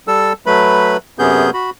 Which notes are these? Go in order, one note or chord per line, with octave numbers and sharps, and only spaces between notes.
G3 A4 E6
F#3 A3 B4 B5
F#2 C3 B3 C#4 G#4 G6
F#4 B5